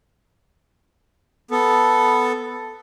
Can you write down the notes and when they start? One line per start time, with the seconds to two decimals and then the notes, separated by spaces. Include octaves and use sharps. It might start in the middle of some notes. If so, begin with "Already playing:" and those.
1.51 B3 A4